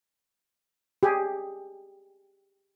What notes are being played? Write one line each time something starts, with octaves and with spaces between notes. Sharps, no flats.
G4 G#4